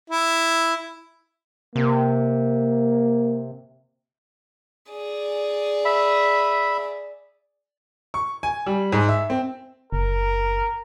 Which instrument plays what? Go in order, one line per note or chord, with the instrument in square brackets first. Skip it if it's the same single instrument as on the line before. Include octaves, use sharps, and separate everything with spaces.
[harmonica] E4
[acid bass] C3 [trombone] A#3
[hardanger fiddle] G#4 D5
[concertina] E5 B5
[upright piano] C#6
G#5
G3
G#2
E5
C4
[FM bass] F#1 [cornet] A#4